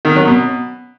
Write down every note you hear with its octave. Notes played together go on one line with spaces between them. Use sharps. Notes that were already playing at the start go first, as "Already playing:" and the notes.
D#3
F#3
B2